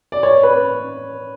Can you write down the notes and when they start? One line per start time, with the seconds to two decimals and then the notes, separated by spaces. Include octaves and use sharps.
0.12 D5
0.23 C#5
0.43 B4